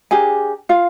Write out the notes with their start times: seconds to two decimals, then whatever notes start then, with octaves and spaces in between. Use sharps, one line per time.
0.11 D4 G4 G#4 A#4 G#5
0.69 F4 F5